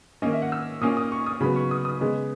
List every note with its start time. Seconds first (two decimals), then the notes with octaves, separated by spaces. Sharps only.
0.22 D#3 A#3 C#4 D#5
0.33 E5
0.42 F#5
0.52 E6
0.81 A#2 A#3 C#4 D#6
0.97 D#6
1.12 C#6
1.26 D#6
1.41 C#3 F#3 B3 B5
1.56 C#6
1.71 D#6
1.85 D#6
2.01 C#3 G#3 B3